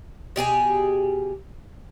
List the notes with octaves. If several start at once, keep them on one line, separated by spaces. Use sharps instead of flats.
B2 G4 G#4 G#5